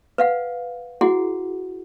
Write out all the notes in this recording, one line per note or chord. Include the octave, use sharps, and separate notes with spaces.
B4 F5 F#5
E4 F#4 G#4 F#5